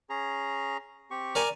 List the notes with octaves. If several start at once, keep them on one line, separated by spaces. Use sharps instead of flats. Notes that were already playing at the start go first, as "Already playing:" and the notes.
C#4 G#4 A#5
C4 G4 C#6
A#4 D5 G#5